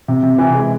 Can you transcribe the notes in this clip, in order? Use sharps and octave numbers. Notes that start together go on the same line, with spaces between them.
C3
C3
E3
G#3